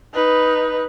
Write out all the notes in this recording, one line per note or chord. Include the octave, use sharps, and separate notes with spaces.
D#4 B4